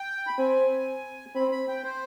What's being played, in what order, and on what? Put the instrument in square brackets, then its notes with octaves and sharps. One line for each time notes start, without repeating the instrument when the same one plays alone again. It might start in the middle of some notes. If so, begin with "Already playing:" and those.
Already playing: [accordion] G5
B5
[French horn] C4 [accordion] G#5
[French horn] C4 [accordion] B5
[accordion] B5
G5
C5